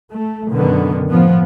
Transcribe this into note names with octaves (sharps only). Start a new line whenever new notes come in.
A3
F#2 B2 D3 D#3 B3
A2 F3 B3